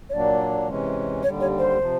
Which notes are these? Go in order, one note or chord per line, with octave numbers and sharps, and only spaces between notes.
C#5
A#2 F#3 A#3 D4 D5
C3 E3 G#3 C#4
D#2 D3 G3 C#5
C#5
C5
C3 F3